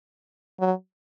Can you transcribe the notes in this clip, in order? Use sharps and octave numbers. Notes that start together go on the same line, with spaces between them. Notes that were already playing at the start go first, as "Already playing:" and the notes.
F#3